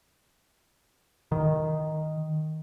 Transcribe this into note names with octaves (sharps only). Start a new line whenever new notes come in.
D#3